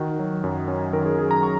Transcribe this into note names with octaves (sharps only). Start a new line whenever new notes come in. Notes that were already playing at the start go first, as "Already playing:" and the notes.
Already playing: D#3 F#4
F#3
F#2
C#4
D#3 A#4
G#4
F#3 G#4
A#5
C#6